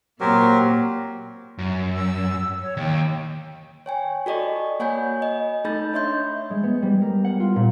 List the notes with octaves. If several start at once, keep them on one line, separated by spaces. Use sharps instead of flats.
A#2 F#3 A#3 C4 G4 A#4
F#2
E6
C#5
D#2 G5
C#5 G5 G#5
F#4 A4 D5 D#5 C#6
A#3 C#5 F#5 G#5 B5 G6
D#5
A3 D#4 A4 B5 G6 A6
D4 C#5 D#5 E5 C6 G6
G#3
B3
G3
A#4
F#5
F4
A#2